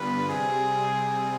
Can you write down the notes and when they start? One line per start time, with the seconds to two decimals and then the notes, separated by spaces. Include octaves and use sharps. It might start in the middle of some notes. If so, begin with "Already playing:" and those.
Already playing: G2 D3 G3 B3 F4 B4
0.29 C3 G3 C4 G#4